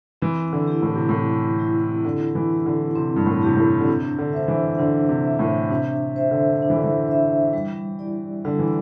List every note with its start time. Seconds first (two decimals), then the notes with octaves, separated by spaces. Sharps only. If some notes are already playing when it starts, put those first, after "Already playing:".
0.22 E3 C4
0.53 D3
0.67 E4 G4
0.82 A2
0.95 C3
1.09 A2 C4
1.59 E4 G4
2.05 D3 C4
2.35 E3
2.50 E4 G4
2.66 D3
2.95 C3 C4
3.16 G2
3.26 A2
3.42 C3 E4 G4
3.57 A2
3.80 D3
3.87 C3 D4
4.18 D3
4.33 C5 E5
4.48 E3
4.79 D3 D4
5.09 C3
5.25 C5 E5
5.39 A2
5.70 C3 D4
6.16 C5 E5
6.31 D3
6.62 D4
6.70 E3
6.76 D3
6.84 E3
7.07 C5 E5
7.53 G3
7.99 E4 G4 D5
8.45 D3 G3
8.59 E3